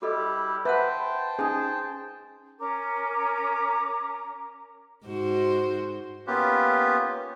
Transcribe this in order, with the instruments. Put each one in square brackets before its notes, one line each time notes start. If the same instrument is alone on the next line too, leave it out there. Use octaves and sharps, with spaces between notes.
[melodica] G3 E4 G4 [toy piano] F#4 A4 D#5
[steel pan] B4 [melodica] C5 G5 A5 [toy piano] E5 F#5
[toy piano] C#4 D#4 [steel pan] G#4
[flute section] C#4 A#4 A#5 D6
[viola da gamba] G#2 F#4 C5
[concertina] A#3 B3 C#4 F4 G4 B4